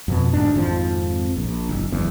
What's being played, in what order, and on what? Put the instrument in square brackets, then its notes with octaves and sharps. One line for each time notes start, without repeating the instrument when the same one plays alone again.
[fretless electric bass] F2 B2
D2 G#2 D4
G#1 F2 F3
A#1
F#1
F#1 E2